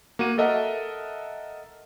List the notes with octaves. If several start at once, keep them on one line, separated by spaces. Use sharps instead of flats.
A#3 F#4 D#7
A4 A#4 D#5 E5 F#5 A5